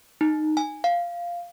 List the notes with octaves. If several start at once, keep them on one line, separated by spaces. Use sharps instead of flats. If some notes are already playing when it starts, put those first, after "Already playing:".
D#4
G#5
F5